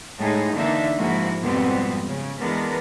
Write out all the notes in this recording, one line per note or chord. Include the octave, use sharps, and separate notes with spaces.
A2 G#3 D#4 G#4
D3 E3 A#3 D4 D#4 E5
G#2 F3 G#3 A#3 E4 F#4
F2 G#2 B2 G3 B3 C4
C#3
E3 G#3 B3 D4 A#4